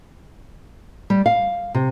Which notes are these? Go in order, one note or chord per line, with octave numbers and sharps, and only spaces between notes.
G3
F5
C3